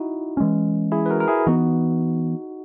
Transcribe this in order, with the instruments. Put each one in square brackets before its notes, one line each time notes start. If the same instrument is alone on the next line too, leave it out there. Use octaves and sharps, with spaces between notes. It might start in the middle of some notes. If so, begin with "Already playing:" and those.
Already playing: [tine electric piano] D#4 E4 F#4
[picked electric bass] E3 G#3 C#4
[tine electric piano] E4 G#4
B4
F#4 A#4
A#4
E4 G#4
[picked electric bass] E3 B3 [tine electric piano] D#4 F#4